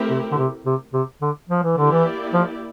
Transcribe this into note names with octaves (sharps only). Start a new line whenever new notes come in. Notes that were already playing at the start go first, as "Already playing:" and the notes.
Already playing: A3 C4 E4 G4 A#4
C3
D3
C3
C3
C3
D3
F3
E3
D3 A#3 E4 G4 D5
E3
F3